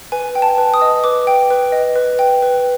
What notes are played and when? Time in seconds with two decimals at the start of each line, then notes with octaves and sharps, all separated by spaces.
0.12 B4 G#5
0.35 G5
0.42 A5
0.58 B4
0.74 D#6
0.82 D#5
1.04 B4 D6
1.27 G5
1.51 B4
1.72 D#5
1.96 B4
2.19 G5
2.42 B4